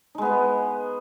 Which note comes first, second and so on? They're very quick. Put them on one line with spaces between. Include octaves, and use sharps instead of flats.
D#4 G#3 B3 B4